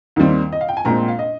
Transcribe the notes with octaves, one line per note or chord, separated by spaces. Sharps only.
D#2 D#3 G3 C4
D#5
F5
G5
G#5
A#1 A#2 G#3 C4 A#5
F5
D#5